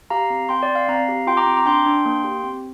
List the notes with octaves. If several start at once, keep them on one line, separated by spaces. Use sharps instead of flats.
G4 F5 A#5
C4
C4 G5 C6
D5 G5
C4
F5
C4 F5 A#5
G4
F4 G5 C6
A#5 D6
C4
A#5 D6
D4 G5 C6
D4
A#3
G4
C4